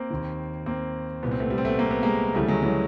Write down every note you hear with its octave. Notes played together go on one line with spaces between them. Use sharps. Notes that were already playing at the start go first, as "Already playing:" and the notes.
Already playing: A#3 C4
D#2 D#3
A#3 C4
C2 A#2 B3
C4
A3 B3
G3 A3
C4
A3 B3
A#3
B3
G#3 A#3
D2 C#3 E3 G3 A3
F#3 G#3
E3 F#3